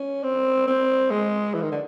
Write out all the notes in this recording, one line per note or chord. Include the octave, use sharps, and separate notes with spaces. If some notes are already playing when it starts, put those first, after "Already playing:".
Already playing: C#4
C4
C4
G#3
E3
D#3
D3